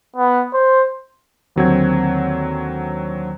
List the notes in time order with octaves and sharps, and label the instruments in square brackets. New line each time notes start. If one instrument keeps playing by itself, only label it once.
[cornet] B3
C5
[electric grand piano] D#2 D3 F#3 C4 F#4 G#6